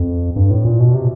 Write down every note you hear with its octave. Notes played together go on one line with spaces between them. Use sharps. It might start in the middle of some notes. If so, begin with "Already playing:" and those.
Already playing: F2
G2
A2
A#2
B2
C3